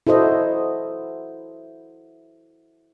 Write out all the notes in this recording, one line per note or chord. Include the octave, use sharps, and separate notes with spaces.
E4 F#4 A4 C5 D#5